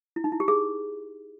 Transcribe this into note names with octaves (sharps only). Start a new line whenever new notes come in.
E4
D#4
E4
G4
G#4